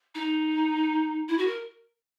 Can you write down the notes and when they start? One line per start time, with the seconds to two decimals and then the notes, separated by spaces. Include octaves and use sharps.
0.15 D#4
1.29 E4
1.38 F#4
1.47 A#4